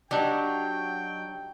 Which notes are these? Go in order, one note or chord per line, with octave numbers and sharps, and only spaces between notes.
F#3 D4 D#4 G4 G5